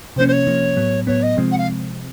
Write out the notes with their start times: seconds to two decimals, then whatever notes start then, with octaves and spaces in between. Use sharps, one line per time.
0.16 C3 F3 A#3 C#4 C5
0.27 C5
0.32 C#5
0.47 C3 F3 A#3 C#4
0.77 A2 F#3 B3
1.07 A2 F#3 B3 C#5
1.22 D#5
1.37 C3 F3 G#3 C4
1.51 F#5
1.58 F5